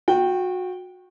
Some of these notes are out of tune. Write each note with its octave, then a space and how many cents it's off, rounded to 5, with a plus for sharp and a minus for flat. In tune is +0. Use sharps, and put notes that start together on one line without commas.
F#4 -25 G5 +0